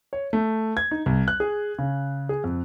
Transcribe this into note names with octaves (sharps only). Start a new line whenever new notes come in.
C#5
A3
G#6
D#4
C2
F#6
G#4
C#3
G#4
F2